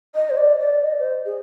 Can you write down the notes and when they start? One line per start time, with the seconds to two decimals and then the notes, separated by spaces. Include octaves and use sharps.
0.15 D#5
0.30 C5
0.37 D5
0.59 D5
0.83 D#5
0.99 C5
1.25 G#4